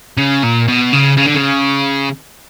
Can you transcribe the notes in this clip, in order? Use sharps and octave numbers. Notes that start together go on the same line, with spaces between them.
C#3
A#2
B2
C#3
C#3
D3
C#3